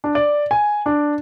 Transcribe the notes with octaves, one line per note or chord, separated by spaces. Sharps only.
D4
D5
G#5
D4